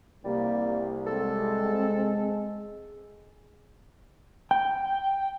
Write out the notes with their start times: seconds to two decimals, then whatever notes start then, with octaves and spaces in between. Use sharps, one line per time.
0.24 C2 G3 A#3
1.06 G#3 C4 A4
4.51 G5